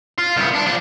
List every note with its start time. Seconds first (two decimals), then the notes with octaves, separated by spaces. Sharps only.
0.18 F4
0.37 C2 B3
0.55 D4
0.66 F3 D4